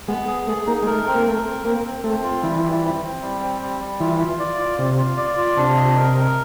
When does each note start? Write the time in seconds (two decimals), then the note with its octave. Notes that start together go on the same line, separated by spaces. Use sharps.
0.08 G#3 B3
0.28 G#4
0.47 A3 G#4
0.67 A#3 D#4
0.82 G#3
0.87 A3 A#4
1.07 C4
1.15 A#3
1.25 A3 A#4
1.45 C4
1.65 A#3 C4
1.85 C4
2.04 A3 C4
2.24 F4
2.43 E3 G3
2.63 G3
2.83 C4
3.02 C4
3.22 G3
3.41 C4
3.61 G3
3.80 G3
4.00 E3 F4
4.19 F4
4.39 D5
4.59 F4
4.78 C3 F4
4.97 F4
5.17 D5
5.37 F4
5.57 C3 D4
5.77 D#5
5.96 A#4
6.15 A#4